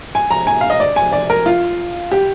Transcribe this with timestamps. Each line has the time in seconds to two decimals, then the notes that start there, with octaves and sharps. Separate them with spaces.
0.15 G#5
0.31 A#5
0.47 G#5
0.61 F5
0.70 D#5
0.80 D5
0.96 G#5
1.12 D5
1.30 A#4
1.46 F4
2.12 G4